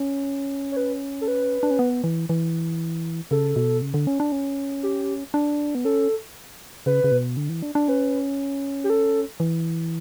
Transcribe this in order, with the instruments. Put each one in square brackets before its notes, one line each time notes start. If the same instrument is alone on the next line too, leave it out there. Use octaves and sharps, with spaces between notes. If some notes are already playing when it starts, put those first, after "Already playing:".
Already playing: [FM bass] C#4
[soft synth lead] C#5
B4
A4
B4
[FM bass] D4
C#4
B3
E3
E3
[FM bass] C#3 [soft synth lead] A4
[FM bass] B2
C#3
D3
C#4
D4
C#4
[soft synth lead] G4
[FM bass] D4
B3
[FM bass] C#4 [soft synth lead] A4
[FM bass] C#3 [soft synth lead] B4
[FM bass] C#3
B2
D3
E3
D4
D4
[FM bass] C#4 [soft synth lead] B4
[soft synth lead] G4
A4
[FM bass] E3